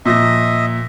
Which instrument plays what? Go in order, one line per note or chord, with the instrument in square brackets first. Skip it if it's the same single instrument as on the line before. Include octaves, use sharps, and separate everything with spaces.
[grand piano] A#2 F3 A#6 [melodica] D#5 E5